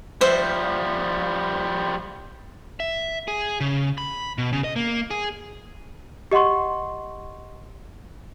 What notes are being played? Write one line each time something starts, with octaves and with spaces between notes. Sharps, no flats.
F3 G3 C5 E5 F#5
E5
G#4
C#3
B5
B2
C#3
D#5
A#3
G#4
G4 D#5 F#5 C6 C#6